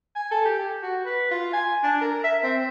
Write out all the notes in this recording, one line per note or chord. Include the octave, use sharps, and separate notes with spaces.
G#5
A4
G4
F#4
B4
F4
G#5
D4
A#4
E5
C4